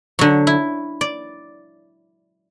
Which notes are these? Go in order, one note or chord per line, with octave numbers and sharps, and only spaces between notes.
D3 F#3
E4
D5